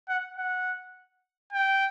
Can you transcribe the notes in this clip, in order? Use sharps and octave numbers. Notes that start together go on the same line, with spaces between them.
F#5
F#5
G5